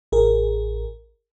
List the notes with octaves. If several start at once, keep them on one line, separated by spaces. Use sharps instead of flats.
A1 G#4 A#4